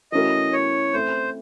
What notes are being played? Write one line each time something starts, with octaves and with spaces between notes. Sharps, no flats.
E3 A3 C#4 F#4 A#4 D#5
C#5
A3 C4 E4 A4 C5